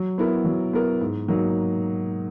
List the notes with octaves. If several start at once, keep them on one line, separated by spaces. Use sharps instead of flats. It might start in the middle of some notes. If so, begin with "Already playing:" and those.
Already playing: F#3
B3 E4 A#4
F#3
B3 E4 A#4
G#2
F#3 A#3 D#4